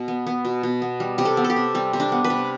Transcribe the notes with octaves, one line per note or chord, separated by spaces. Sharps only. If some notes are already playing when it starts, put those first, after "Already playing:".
Already playing: B2
B3
B3
B2
B2
B3
G3
C3 G4
A4
B3
A4
G4
C3
G3 C4
C3
D4
B3
B4
C3